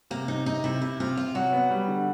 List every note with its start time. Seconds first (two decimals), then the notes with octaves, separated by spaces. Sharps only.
0.11 C3 A#3
0.28 C3 D#4
0.46 C3 D#4
0.64 C3 E4
0.81 C3 E4
1.00 C3 F4
1.17 C3 F4
1.35 F#3 F#4
1.52 B3
1.71 G3
1.88 D3